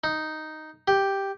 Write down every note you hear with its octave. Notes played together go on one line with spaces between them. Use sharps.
D#4
G4